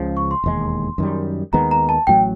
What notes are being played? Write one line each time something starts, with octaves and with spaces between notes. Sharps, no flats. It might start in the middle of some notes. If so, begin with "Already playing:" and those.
Already playing: C#2 C#3 F3
C#6
C6
E1 D#2 D#3 G#3
F#2 D#3 G3
D#2 D#3 G#3 B3 A#5
A#5
A5
A1 A2 F#3 G5